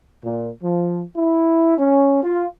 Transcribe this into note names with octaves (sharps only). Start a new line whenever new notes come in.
A#2
F3
E4
C#4
F4